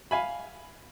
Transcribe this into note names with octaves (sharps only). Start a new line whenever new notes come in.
F5 G#5 B5